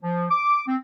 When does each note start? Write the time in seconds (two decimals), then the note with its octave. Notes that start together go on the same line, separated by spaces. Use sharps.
0.02 F3
0.31 D6
0.67 C4